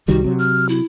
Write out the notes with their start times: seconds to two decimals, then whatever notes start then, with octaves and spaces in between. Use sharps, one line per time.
0.08 C2 D#3 G3 F#4
0.24 C3 F#3
0.39 F6
0.69 E4